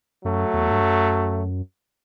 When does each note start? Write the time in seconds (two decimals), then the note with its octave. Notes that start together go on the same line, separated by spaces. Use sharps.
0.24 F#2 F#3 A3
0.53 E2
0.71 G2
0.82 F#2